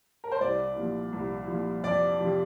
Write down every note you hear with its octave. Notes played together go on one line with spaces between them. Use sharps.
A#4
C5
C2 D5
A#2 F3
C2
A#2 F3
F2 D5
C3 F3